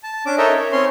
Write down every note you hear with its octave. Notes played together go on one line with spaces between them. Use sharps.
A5
C#4 D4 D6
D#4 A4 A#4 C#5 D#5 E5
C#5
C4 C#4 C#5 C6